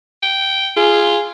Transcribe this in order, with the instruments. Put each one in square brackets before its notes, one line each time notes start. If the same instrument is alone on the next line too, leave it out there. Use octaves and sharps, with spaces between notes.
[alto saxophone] G5
[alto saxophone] F4 [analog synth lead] G#4